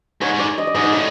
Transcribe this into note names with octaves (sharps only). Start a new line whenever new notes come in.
G#2 C#5
G#2
D5
D#5
D5
G#2 D#5
D5
A2 D#5